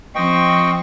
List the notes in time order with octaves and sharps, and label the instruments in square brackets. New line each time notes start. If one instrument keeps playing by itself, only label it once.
[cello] F3 C4 [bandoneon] D#5 G5 C#6